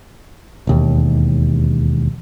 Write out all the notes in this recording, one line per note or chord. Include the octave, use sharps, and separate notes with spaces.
E1 D#2